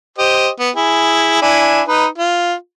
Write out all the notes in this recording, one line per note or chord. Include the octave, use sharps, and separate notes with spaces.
G4 C5 D#5
B3
E4 G#4
D4 E4 G#5
D#4 B4
F4